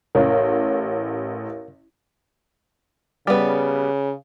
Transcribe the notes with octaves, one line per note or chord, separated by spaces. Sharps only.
A1 A#4 C#5 F5
C#3 G3 B3